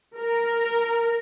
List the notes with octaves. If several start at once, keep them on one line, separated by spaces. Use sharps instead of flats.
A#4